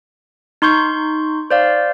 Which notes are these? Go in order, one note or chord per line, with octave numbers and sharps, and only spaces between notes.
D#4 C6 C#6 G6
C5 D5 F5